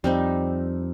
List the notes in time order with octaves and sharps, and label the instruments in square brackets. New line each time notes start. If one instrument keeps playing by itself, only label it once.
[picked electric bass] F2 [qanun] G3 C4 D#4